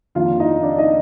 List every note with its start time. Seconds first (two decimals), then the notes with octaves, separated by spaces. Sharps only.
0.15 F2 D#3 A#3 D4 F4 F5
0.40 D#4 D#5
0.63 D4 D5
0.78 D#4 D#5